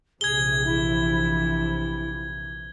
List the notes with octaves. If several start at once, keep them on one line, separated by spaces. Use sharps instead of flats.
A#1 C3 E3 G#4 G#6 G7
E4